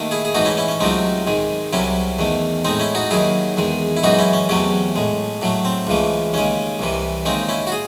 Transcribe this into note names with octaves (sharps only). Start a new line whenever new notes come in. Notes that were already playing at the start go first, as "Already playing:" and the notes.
Already playing: D#2 D#3 A3
E4 G#4
G#4
G#2 E3 A3 D#4 F#4
C#4 E4
C#4 E4
C#4
C#2 C3 F#3 A3 C4 D#4
G#2 D#3 G#3
C2 C3 F#3 C#4 E4
E2 D#3 A3
A2 G#3 C4 D#4
C#4 E4
D#4 F#4
D#2 D#3 F#3 E4 G#4
E2 D#3 G#3
E4
F#2 E3 G#3 D#4 F#4
C#4 E4
C#4
E2 C3 F#3 A3 C#4
A2 G#3
A2 F#3 A3
C4
C#2 C#3 E3 A3
D#2 C#3 G#3 C#4
C2 C3 E3
D#2 C#3 G#3 C4 D#4
C#4 E4
F#4
G#4